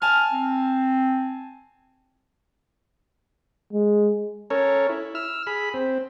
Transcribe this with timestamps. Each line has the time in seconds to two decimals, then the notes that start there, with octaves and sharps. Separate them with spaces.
0.02 G#5 A5 F6
0.32 C4
3.73 G#3
4.50 C#4 A4 A#4 C#5
4.89 E4
5.15 E6 F6
5.47 G#4 B5
5.74 C4